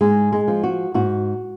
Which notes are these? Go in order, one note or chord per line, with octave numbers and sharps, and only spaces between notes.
G#2 G#3
G#3
F3
F#4
G#2 F#4